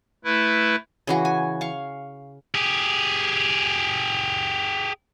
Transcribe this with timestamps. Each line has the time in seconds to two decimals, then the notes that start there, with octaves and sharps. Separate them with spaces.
0.24 A3 E4 B4
1.07 C#3 E3 F#4
1.25 G#5
1.61 F5 C#6
2.55 G4 G#4